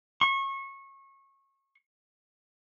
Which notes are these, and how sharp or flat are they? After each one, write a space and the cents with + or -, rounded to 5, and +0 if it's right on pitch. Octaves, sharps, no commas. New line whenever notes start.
C#6 -25